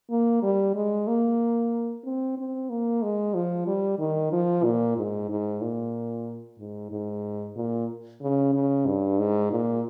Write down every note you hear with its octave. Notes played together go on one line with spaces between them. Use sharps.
A#3
G3
G#3
A#3
C4
C4
A#3
G#3
F3
G3
D#3
F3
A#2
G#2
G#2
A#2
G#2
G#2
A#2
C#3
C#3
G2
G#2
A#2